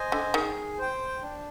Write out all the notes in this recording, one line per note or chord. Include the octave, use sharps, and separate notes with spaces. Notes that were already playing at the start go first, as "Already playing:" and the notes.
Already playing: C5 D#5 G#5
D3
D#3 G#4
C5 G5
D4